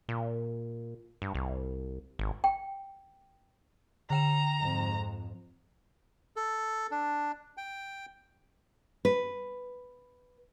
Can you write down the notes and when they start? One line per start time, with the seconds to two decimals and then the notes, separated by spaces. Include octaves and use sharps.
0.09 A#2
1.22 G2
1.35 C2
2.19 G#1
2.44 G5
4.10 D3 G5 A#5 E7
4.61 F2 G#2
6.36 A4
6.91 D4
7.57 G5
9.05 B4